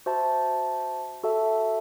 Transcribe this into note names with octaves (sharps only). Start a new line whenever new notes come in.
F#4 C5 E5 A5
F#4 A4 E5 A5